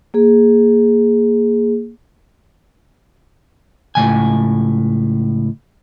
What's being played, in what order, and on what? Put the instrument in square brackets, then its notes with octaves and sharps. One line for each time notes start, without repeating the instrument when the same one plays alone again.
[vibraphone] A#3 G#4
[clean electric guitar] C#2 A2 C#3 G#5